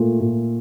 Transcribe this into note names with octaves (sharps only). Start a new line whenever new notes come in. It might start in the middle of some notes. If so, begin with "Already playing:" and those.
Already playing: A#2 A3
A#2